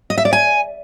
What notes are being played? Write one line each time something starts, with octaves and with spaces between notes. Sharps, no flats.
D#5
E5
D5
G#5